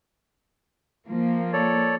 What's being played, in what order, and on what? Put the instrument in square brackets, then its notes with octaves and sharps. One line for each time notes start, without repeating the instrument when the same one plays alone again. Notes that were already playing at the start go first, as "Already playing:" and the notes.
[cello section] F3 A#3
[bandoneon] A4 C#5 D5